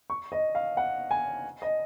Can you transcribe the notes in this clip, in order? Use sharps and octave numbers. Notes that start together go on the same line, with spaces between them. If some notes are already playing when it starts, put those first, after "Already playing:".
C#6
D#5
F5
F#5
G#5
D#5